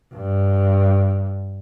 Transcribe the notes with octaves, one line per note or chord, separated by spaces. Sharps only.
G2